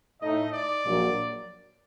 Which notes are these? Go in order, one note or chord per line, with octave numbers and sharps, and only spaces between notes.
A2 A3 D#4 D#5
D5
A#1 A#2 F#3 A#3